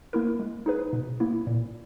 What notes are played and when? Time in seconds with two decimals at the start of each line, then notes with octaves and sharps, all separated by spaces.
0.13 A#3 E4 A#4
0.39 G#3
0.66 D#4 G#4 B4
0.93 B2
1.20 A#3 E4
1.47 A#2